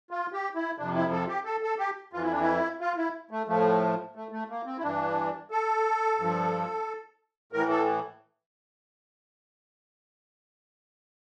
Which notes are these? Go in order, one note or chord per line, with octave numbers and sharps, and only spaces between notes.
F4
G4
E4
F2 C3 F3 D4
E4
A4
G4
A4
A4
G4
F2 E3 F4
E4
D4
E4
F4
E4
A3
A2 F3 A3
A3
A3
A#3
C4
E4
G2 E3 D4
A4
G2 F3
A2 E3 A#4
A4